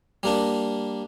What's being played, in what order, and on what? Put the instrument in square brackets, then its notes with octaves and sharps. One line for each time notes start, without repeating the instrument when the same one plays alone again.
[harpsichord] G3 A#3 D4